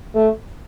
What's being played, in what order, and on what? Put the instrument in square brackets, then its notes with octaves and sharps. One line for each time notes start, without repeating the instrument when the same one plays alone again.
[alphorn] A3